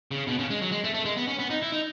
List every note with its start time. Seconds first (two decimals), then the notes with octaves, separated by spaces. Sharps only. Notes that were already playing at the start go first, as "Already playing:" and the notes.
0.11 C#3
0.27 B2
0.39 C#3
0.50 G#3
0.62 F#3
0.72 G#3
0.84 A3
0.94 A3
1.05 G#3
1.17 B3
1.28 C#4
1.39 B3
1.50 D#4
1.62 E4
1.72 D#4